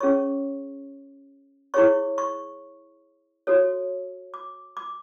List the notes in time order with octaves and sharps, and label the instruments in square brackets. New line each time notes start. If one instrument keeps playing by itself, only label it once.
[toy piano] C#4 G#4 C#5 C#6
E4 G#4 C#5 C#6
C#6
F#4 A4 C#5
D6
D6